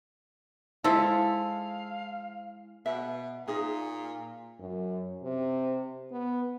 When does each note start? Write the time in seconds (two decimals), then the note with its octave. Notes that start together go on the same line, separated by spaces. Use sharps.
0.84 F3 G#3 E4 A4 F5
2.86 B2 E5
3.47 A#2 D#4 G#4 F5
4.59 F#2
5.24 C3
6.11 B3